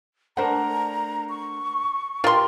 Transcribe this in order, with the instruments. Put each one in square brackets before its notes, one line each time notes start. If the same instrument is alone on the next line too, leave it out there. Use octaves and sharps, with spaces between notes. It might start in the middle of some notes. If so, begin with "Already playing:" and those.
[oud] A3 D4 [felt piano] A#4 C5 F#5 [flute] A#5
[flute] C#6
[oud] A#2 G4 [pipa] F4 C6 [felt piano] A#4